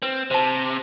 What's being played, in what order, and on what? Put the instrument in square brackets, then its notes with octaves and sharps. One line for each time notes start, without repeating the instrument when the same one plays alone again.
[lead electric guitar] C4 [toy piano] B4
[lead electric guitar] C3 [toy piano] C5 A5